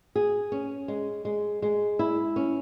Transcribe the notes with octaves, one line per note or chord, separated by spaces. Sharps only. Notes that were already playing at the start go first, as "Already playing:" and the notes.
G#4
C#4
G#3
G#3
G#3
E4
C#4